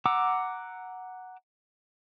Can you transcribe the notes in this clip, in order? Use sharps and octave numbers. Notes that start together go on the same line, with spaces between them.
F#5 A#5 D6 E6